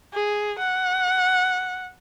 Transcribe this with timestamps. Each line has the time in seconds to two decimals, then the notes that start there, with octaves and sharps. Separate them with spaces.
0.14 G#4
0.59 F#5